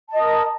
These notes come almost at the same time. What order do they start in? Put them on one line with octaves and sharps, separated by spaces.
A5 D#5 D#6 A#4